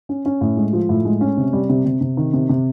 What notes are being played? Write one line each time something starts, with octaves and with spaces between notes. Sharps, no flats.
C#4
C#4
A2
G#3
F3
A2
G#3
C#4
C3
G3
C3
C3
C3
D#3
C3
C3